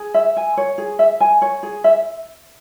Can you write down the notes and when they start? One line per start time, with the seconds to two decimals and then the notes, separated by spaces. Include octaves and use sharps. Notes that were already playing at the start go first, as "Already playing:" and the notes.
Already playing: G#4
0.14 E5
0.37 G#5
0.57 C#5
0.78 G#4
0.99 E5
1.20 G#5
1.42 C#5
1.63 G#4
1.84 E5